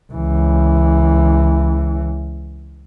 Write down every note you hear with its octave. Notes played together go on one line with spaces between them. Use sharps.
C#2 E3